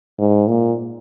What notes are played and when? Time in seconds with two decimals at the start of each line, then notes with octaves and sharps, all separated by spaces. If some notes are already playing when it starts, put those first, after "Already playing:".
0.19 G#2
0.48 A#2